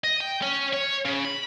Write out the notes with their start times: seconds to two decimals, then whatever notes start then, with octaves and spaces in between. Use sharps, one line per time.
0.04 D#5
0.20 G5
0.42 C#4
0.73 C#5
1.05 C#3
1.25 B5